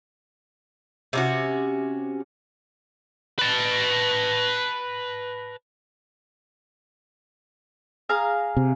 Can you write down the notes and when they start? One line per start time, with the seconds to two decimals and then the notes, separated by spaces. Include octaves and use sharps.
1.13 C3 C#4 F#4
3.39 B4 A5
8.09 G#4 F5 A#5
8.57 C3